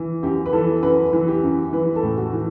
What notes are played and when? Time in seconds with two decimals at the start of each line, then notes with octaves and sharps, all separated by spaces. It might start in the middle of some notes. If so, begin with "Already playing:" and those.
Already playing: E3
0.23 F#2 G4
0.46 B4
0.53 E3 A4
0.83 F#2 B4
1.13 E3
1.28 G4
1.43 F#2
1.73 E3 B4
1.96 A4
2.03 A2
2.18 F#4
2.33 E3